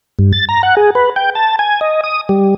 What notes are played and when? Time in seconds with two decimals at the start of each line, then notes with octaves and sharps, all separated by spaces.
0.19 G2
0.33 A6
0.49 A#5
0.63 F#5
0.77 G#4
0.95 B4
1.16 G5
1.35 A5
1.59 G#5
1.81 D#5
2.04 D#6
2.29 G3